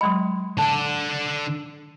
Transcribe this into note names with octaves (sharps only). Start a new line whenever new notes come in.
F#3 G#3 D#5 B5 C6
D3 D4 A5